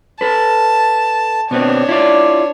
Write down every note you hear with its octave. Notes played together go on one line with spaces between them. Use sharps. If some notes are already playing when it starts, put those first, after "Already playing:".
A4 B4 A5
B2 B3 C4 D4 C#5
E4 F4 D5